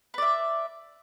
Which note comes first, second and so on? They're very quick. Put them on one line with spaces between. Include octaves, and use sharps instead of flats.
B4 D5 E5